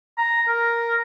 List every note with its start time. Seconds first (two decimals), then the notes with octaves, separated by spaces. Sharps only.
0.18 A#5
0.48 A#4